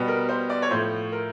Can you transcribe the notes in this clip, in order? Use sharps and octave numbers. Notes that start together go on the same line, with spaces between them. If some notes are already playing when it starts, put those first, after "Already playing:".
Already playing: B2 G3 B3
A#4
C5
D5
C#5
A2 F3 A3 C5
A#4